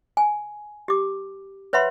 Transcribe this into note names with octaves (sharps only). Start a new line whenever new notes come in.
G#5
G4 D6
B4 C#5 E5 F#5 B5 C6